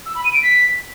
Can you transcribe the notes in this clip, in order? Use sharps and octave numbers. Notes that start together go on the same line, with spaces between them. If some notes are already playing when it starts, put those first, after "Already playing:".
E6
B5
D#7
D7
B6